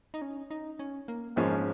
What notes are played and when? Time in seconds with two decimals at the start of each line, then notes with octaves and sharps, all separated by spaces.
0.14 D#4
0.22 C#4
0.51 D#4
0.79 C#4
1.08 A#3
1.36 G#1 G#2 F3 G#3 A#3 C#4